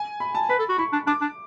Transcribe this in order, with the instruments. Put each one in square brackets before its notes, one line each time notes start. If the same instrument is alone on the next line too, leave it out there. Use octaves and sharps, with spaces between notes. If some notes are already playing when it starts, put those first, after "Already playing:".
Already playing: [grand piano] G#5
B5
A5
[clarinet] B4 [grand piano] B5
[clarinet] A4
F#4
[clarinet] E4 [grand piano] C#6
[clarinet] D4
[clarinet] D4 [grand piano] D6
[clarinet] D4